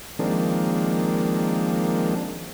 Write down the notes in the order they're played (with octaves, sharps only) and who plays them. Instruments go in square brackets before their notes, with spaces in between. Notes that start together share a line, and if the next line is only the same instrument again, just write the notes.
[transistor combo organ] D#3 F3 G#3 A#3 C4 D4